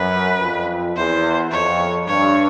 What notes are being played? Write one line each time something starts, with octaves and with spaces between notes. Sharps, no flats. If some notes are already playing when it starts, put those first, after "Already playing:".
Already playing: F#2 B4
F2
E2 C5
F2 C#5
G2 C#5